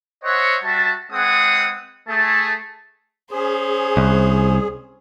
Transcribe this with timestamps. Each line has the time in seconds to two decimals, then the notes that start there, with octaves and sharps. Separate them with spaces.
0.23 C5 C#5 D#5 E5 F#5
0.63 G3 F#4 E5 A5
1.11 G#3 C4 G#4 B4 F#5 D#6
2.08 A3 G#4 A5
3.31 C#4 G#4 C5
3.97 C2